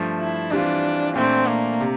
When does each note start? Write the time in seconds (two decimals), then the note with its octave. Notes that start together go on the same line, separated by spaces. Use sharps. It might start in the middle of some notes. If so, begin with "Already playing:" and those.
Already playing: G2 F3 A3
0.20 E4
0.51 E3 G3 C4 D4 F4
1.15 A#2 A3 C4 D4
1.48 A#3
1.81 C3